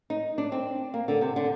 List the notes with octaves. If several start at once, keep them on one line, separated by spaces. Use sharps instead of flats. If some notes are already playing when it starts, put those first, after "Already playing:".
D#4
D4
C4
A#3
D3
C3
D3